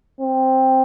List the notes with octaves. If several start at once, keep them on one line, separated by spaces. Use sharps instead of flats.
C4